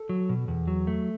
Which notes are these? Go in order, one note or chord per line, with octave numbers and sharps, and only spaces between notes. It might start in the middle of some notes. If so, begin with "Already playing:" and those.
Already playing: A4
F#3
B2
E2
F#3
A3